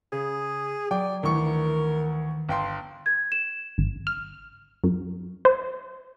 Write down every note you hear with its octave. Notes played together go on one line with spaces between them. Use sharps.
C#3 G#4
F#3 D5 G5
D2 D#3 E3 A#4 C#6
G1 G5 C6
G#6
E7
G#1
F6
F#2
C5